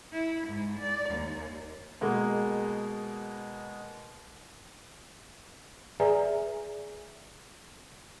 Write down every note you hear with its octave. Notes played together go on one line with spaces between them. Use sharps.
E4
G#2
D5
D#2
B2 G#3 A#3
G#4 B4 D5 E5 G#5 A#5